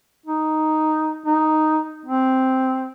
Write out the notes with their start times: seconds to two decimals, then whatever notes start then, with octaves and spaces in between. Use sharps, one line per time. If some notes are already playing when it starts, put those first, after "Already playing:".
0.26 D#4
1.26 D#4
2.06 C4